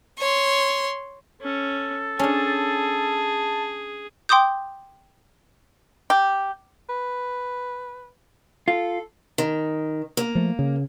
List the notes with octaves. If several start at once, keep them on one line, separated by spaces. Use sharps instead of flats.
C#5 C6
C#4 A4
C#4 D4 G#4 A5
G5 C6 D6 D#6 G6
G4
B4
F4 A4
D#3
A#3
F3 A3
C#3